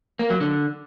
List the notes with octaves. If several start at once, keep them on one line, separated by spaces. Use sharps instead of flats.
A#3
F#3
D3